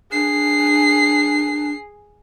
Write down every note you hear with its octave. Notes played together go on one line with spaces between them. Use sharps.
D4 G#4 C7